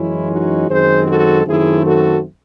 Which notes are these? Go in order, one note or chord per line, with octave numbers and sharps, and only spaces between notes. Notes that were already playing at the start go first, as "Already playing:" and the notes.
Already playing: F#2 E3 G#3 C#4 E4
D#4 F#4
F#2 D#3 G#3 C4 G#4 C5
F#4 A4
F#2 D#3 A3 C4 E4 G#4
F#4 A4